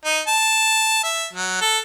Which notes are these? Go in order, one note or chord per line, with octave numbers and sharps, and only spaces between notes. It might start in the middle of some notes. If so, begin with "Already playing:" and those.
D#4
A5
E5
F#3
A4